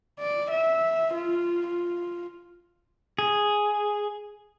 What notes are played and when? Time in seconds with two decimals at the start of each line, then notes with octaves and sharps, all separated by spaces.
0.19 D5
0.50 E5
1.13 F4
1.67 F4
3.19 G#4